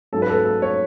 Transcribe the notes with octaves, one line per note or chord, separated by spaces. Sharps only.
G#2 F#3 C#4 A4
B4
A4
A4
C#5